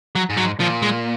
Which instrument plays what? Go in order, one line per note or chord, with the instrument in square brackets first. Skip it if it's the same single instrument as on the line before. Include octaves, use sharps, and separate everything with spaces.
[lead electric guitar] F#3
[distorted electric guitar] G#2
[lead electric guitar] F#3
[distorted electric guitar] A#2 [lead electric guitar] F3
[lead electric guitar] G#3